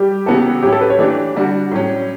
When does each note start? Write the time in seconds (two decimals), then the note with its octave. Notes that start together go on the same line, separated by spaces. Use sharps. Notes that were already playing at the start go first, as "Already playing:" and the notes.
Already playing: G3 G4
0.26 C#3 E3 B3 F#4 A4
0.63 A2 F#3 C#4 E4 G4
0.72 A4
0.81 B4
0.90 C#5
0.99 E3 A3 D4 G4 D5
1.35 D3 G3 D4 F#4
1.72 A2 F#3 C#4